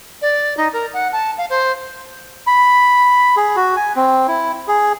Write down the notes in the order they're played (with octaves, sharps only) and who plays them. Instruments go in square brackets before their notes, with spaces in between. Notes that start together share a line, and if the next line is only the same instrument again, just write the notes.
[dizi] D5
D#4
A#4
F#5
A5
F5
C5
[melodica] B5
G#4
F#4
G#5
C4
E4
G#4